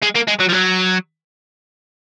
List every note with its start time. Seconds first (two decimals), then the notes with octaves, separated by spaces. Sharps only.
0.03 G#3
0.16 A#3
0.28 G#3
0.40 F#3
0.49 F3
0.53 F#3